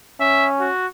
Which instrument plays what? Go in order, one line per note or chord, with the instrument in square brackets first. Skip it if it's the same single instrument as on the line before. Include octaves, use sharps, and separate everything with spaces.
[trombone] C#4 [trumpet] E5
[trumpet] F#4